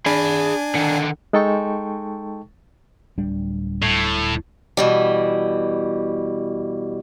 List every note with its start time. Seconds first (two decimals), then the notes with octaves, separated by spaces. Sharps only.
0.06 D4 G#4 G#5 B5
0.75 D3 D#3
1.33 G#3 D#4 A4 G5 A5 C#6
3.18 D1 G3 D4
3.83 A2
4.77 B2 E3 G3